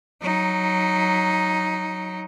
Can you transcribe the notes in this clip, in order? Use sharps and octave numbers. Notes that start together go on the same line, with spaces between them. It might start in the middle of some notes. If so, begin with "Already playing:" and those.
F#3 D#4